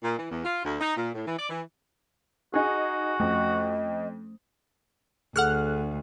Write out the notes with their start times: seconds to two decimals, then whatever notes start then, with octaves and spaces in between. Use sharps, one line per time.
0.03 A#2
0.19 E3
0.31 E2
0.45 F4
0.65 D2
0.81 D#4
0.97 A#2
1.14 A2
1.27 E3
1.38 D5
1.49 E3
2.54 D#4 F#4 G#4
3.20 F2 A3 C#4 D#5
5.36 D2 G#4 A4 F#5 F6 F#6